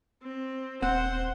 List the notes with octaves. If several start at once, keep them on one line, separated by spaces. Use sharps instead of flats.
C4
D#1 C4 C5 F#5